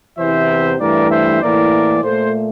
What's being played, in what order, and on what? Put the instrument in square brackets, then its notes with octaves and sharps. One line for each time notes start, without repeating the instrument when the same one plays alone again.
[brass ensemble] E2 C3 E3 C5 E5
G2 E3 A3 A#4 D5
C5 E5
A2 E3 A#3 A#4 D5
A#2 A3 A4 C5